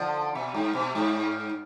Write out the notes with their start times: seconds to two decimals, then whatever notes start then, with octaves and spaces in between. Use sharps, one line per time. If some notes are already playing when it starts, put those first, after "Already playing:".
Already playing: D3 F3
0.35 B2
0.54 G#2
0.75 B2
0.95 G#2